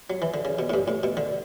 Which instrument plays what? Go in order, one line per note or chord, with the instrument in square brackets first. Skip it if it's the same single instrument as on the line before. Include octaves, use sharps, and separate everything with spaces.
[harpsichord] F#3
E3
D3
C#3
B2
A2
G2
A2
B2
D3